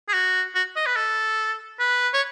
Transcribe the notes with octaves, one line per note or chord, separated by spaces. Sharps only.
G#4
F#4
F#4
D#5
B4
A4
B4
C#5